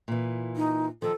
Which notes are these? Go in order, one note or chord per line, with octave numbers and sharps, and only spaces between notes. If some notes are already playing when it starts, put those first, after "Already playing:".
A#2 E3
D#4
D#3 F3 A4